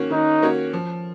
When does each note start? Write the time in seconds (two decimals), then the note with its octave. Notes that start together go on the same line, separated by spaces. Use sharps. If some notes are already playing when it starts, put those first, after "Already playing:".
Already playing: D#3 A#3 C#4 F#4 C#5
0.11 D#3 D#4
0.43 A#3 C#4 F#4 C#5
0.73 F3